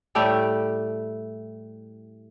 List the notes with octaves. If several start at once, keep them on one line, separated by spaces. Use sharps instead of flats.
A2 G3 A3 G4